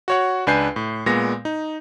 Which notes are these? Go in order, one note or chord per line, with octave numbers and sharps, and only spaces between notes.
F#4 C#5 F#5
C#2 D4 B4 G#5 G6 C7
A2
A#2 G#3 B3 A#6
D#4